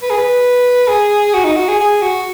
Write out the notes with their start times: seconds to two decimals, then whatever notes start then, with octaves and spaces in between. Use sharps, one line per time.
0.02 B4
0.10 G#4
0.18 B4
0.88 G#4
1.34 F#4
1.44 D#4
1.56 F#4
1.68 G#4
1.80 G#4
2.02 F#4